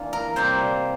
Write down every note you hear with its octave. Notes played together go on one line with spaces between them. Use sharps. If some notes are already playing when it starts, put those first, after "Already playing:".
Already playing: E3 A#3 D4 F4
A#4
C3 G3 A#3 C5